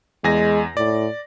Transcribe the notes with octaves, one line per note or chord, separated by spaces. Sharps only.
E2 G#3 G#5 A#6
A2 D5